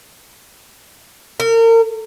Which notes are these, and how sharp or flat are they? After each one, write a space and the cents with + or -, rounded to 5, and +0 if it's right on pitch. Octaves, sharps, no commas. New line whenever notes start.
A#4 -35